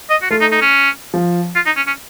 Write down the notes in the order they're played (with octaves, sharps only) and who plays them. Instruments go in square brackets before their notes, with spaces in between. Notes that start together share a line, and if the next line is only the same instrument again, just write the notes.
[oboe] D#5
F#4
[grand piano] A3 [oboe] F4
[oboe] D#4
D#4
C#4
[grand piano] F3
[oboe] F4
D#4
C#4
C#4